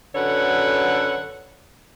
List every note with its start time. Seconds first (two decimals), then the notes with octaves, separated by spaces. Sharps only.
0.15 F#2 D3 A4 B4 C#5 F#5